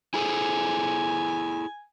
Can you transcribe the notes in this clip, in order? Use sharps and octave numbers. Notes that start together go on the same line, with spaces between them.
E4 G#4 A4 G#5